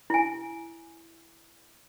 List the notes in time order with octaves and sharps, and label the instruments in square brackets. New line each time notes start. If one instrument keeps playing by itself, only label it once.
[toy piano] E4 G#5